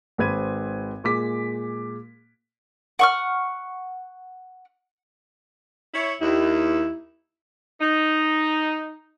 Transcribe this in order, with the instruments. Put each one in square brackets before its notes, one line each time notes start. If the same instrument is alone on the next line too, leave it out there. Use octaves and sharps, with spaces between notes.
[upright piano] G#1 B4 C5 B5 G#6 D#7
A#2 G#3 D6 B6
[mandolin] F#5 C#6 F6
[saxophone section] E4 C#5
[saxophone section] D#2 [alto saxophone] E4
[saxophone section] D#4